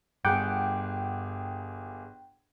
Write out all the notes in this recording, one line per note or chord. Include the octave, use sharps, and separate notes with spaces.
G1 G2 G#4 F#5 G5 D6